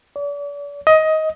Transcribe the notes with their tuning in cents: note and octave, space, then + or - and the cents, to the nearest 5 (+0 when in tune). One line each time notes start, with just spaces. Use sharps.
D5 -40
D#5 +15